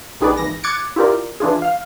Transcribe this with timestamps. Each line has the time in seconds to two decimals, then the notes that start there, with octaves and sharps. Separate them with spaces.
0.21 A#1 D#3 G#4 B4 D5
0.37 G#1 E3 A#6
0.64 D6 F#6 G#6 A6 C#7 D7
0.96 E4 F4 G4 A#4 D5
1.40 E3 D4 F4 G#4
1.62 F5 F6